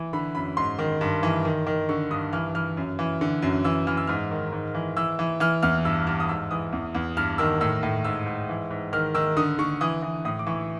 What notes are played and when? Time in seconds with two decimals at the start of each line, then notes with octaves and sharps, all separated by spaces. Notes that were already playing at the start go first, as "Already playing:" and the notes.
Already playing: E3
0.13 D3 B5
0.35 F#2 B5
0.57 G#2 C6
0.79 D#3
1.01 G2
1.23 E3
1.45 D#3
1.67 D#3
1.89 D3 C#6
2.10 G2 D#6
2.33 E3 F6
2.55 E3 F6
2.77 F#2
2.99 E3
3.21 D3
3.42 F#2
3.65 E3 E6
3.87 E3 F6
3.97 E6
4.07 G#2 F6
4.31 D#3
4.53 G#2
4.74 E3
4.97 E3 E6
5.19 E3
5.40 E3 F6
5.63 E2 F6
5.85 G2 E6
6.07 G2 F6
6.20 D#6
6.29 G#2 E6
6.51 E3 D#6
6.73 E2
6.95 E2
7.17 G2 F6
7.38 D#3 E6
7.61 A2 E6
7.83 A2
8.04 G#2 E6
8.26 G#2
8.49 E3
8.71 G#2
8.93 D#3 F6
9.15 D#3 E6
9.37 D3 D#6
9.59 D3 C#6
9.81 E3 D#6
10.02 E3
10.25 A2 D#6
10.39 D6
10.47 E3 C#6